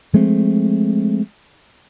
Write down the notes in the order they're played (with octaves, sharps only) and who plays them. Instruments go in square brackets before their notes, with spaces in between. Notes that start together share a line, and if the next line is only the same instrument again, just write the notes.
[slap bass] F3 G#3 A3 C4